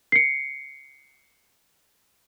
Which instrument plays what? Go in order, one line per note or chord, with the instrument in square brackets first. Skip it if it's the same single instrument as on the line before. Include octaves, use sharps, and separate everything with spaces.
[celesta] C7 C#7